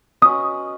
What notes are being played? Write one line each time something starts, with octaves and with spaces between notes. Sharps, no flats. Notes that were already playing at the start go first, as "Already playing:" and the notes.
C#4 F#4 B4 D#5 D#6